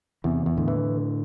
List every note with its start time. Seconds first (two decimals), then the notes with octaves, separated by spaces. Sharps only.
0.24 E2 C3 E3
0.46 E2
0.57 A2 D3
0.68 E3